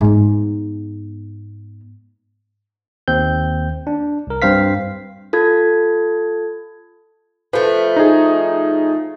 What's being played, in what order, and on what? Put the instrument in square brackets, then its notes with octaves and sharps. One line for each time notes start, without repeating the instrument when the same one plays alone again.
[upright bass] G#2 B3
[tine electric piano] D#2 C4 G6
D4
C2 A#4
G2 C4 C5 F5 B6
[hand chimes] F4 A4 G#6
[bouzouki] F3 A3 [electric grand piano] B4
[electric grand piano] D#4 G#4